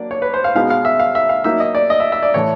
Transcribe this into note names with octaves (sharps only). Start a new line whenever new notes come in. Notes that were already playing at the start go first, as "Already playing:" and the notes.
Already playing: F#3 A#3 D4 D5
C#5
B4
C5
F5
B2 G#3 B3 D#4 F5
F5
E5
F5
E5
F5
F#3 A#3 D#4 E5
D#5
D5
D#5
E5
E5
D5
A2 E3 A3 C#5